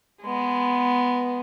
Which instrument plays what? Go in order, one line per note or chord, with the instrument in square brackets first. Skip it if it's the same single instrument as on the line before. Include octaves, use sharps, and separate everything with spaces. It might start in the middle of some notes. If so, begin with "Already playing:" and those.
[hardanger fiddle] G#3 B3